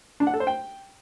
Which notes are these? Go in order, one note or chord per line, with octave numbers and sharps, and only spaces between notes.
D4
F#5
A4
C5
G5